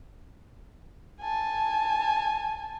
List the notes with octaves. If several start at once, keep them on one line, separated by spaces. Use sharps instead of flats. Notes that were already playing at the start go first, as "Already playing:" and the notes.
G#5 A5